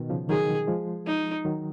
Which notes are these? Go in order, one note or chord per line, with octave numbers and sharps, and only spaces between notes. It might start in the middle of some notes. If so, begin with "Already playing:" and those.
Already playing: B2 D#3
C#3 F3
D#3 F#3 G#4
F3 G#3
D#4
D#3 F#3